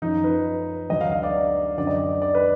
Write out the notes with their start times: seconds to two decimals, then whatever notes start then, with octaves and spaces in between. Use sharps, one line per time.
0.02 F#2 F3 D#4
0.24 B4
0.90 D2 D3 F#3 D#5
1.01 F5
1.12 F5
1.23 D5
1.78 F#2 D3 F#3 D5
1.87 D#5
1.97 D5
2.22 D5
2.35 B4